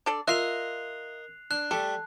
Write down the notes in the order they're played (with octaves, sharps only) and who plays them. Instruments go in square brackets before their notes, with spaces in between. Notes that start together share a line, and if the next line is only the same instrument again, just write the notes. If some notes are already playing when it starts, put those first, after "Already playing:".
[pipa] D4 A4 D5
[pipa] F4 E5 [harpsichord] A#4 D#5 [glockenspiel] F#6 C7 F7
[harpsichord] D4 [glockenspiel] F#6
[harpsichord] G3 A3 D6 [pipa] A4